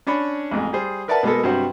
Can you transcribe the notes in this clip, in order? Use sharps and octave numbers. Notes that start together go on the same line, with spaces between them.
C#4 D4 C#5 B5
A1 F2 G#3
G3 G#4 C5
A#4 B4 D5 E5 F#5 A5
B2 G#3 A#3 B3 A4
G2 C3 F#3 F#4 C5 F#5